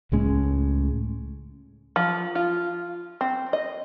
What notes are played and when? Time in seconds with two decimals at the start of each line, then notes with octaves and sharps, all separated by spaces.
0.12 C#2 A2 G#3 C#4
1.96 F3
2.35 F4
3.21 C4
3.53 D#5